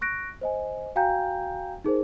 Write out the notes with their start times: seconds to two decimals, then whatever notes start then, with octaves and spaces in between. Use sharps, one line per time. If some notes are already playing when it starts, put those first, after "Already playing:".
0.01 C#6 F#6 A#6 D7
0.41 C5 D#5 G#5
0.96 F#4 F5 G5 G#5 A#5 G6
1.84 D#4 G#4 A#4 C5